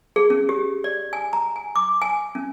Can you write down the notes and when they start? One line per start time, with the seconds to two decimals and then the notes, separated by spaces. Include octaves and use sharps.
0.16 G#4
0.30 C#4
0.49 G4
0.84 D5
1.13 G#5
1.33 A#5
1.56 G#5
1.76 D6
2.02 G#5
2.35 C#4